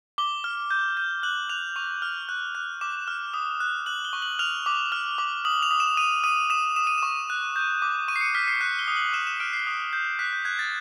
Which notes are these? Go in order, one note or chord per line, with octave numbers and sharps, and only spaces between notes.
D6 G7
F6
G6
G6
F#6 F#7
F#6 F7
C#6 F7
F6
F#6
F#6
D6 E7
F6
D#6
F#6
F#6 F#7
G7
C#6
F#7
F6 F7
D6
F6
D6
D#6 F#7
F7
D#6
E7
D#6 D#7
D#6 D#7
D#6 E7
D#6 E7
D#7
C#6 E7
F#6
G6
D6
C#6 D#7
C7
C#7
F6 B6
C7
F#6 C#7
G7
D#6
F#7
F6 E7
E7
F6 D7
C7
D#6
G6
F#6 B6
G6
F#6 G#6
A6